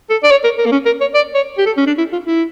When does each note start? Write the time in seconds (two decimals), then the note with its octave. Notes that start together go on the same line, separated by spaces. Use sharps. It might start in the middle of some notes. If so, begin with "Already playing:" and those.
0.10 A4
0.23 D5
0.31 C#5
0.44 A#4
0.58 A#4
0.66 A#3
0.72 C#4
0.86 A#4
1.01 C#5
1.14 D5
1.35 C#5
1.58 G4
1.66 A4
1.77 C#4
1.87 D4
1.98 E4
2.12 F4
2.26 E4